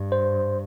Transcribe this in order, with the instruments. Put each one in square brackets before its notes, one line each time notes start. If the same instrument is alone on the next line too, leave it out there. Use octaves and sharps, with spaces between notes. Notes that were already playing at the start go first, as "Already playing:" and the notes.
Already playing: [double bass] G2
[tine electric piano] C5